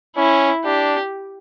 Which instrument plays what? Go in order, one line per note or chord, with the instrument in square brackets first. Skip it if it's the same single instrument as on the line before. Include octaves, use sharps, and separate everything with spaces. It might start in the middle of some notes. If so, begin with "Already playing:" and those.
[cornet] C#4 [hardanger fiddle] E4
[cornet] D4 [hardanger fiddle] G4